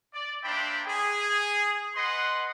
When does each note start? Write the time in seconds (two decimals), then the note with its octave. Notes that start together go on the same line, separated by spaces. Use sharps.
0.13 D5
0.43 A#3 D4 C5 E5 G5 B5
0.86 G#4
1.95 B4 D#5 F#5 C6